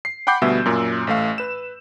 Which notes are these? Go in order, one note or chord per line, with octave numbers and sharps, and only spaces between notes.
C7
F#5 G5 B5 D6 G6 C7
D2 B2 G3 B3 E5 E6
F#2 A#2
A1 A3 F5
B4 E7